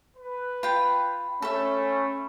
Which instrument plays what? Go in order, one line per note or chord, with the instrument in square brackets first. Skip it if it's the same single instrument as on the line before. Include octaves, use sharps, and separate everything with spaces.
[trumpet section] B4
[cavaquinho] F4 G5 [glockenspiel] B5
[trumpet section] A3 [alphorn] C#4 [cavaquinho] A4 E5